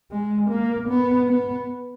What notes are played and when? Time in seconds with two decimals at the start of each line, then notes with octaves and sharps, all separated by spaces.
0.11 G#3
0.50 A#3
0.89 B3
1.28 B3